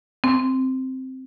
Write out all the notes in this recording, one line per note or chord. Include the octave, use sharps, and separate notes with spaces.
C4